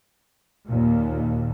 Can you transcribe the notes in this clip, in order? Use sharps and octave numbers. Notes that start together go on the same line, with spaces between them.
D#2 A#2